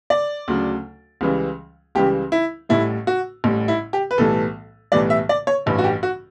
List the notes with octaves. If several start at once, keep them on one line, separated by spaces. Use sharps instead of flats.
D5
D2 C#3 F#3
C#2 C#3 E3 G3
C#2 C#3 E3 G3 G4
E4
A1 A2 G3 E4
F#4
A1 A2 G3
E4
G4
B4
B1 A2 E3 G3 A4
B1 A2 E3 G3 D5
E5
D5
C#5
A1 G2 E3 G3
F#4
G4
F#4